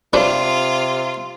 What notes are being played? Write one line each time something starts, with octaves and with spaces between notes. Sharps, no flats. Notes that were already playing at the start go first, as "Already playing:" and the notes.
C3 D4 F4 B4 C5